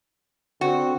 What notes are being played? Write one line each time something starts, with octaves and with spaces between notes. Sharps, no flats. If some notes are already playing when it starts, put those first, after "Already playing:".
D3 C4 F#4